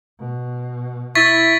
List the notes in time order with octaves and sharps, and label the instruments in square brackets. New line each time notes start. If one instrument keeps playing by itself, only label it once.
[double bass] B2
[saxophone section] E4 [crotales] C#6 A6 B6